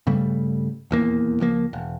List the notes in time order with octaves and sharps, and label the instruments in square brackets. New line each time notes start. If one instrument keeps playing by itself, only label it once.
[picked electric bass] G2 C#3 G3 A3
D#1 E2 A#3
C#2 F3 A#3
E1